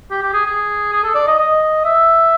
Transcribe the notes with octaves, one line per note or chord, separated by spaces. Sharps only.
G4
G4
G#4
G#4
G#4
A4
D5
D#5
D#5
E5